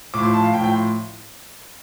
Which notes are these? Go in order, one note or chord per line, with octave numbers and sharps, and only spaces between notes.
A2 F3 D6
C6
A5
F5
A2 F3 G5
G5
C6